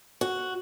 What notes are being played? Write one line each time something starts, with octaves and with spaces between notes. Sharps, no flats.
F#4